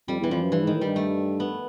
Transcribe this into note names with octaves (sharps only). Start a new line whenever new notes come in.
F2 G3
E2
E3
F2 F3
F#2
G2 E3
G#2
D#3
A2
G2 G3
A3
B3